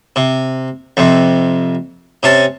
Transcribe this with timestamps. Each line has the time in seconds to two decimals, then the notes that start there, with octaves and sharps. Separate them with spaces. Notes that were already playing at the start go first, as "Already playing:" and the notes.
0.16 C3
0.97 F2 C3
2.23 C3 C#4 A5